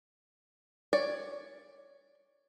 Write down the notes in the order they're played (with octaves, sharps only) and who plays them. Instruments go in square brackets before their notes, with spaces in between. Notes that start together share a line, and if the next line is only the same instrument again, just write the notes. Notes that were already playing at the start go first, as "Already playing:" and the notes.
[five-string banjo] C#5 D5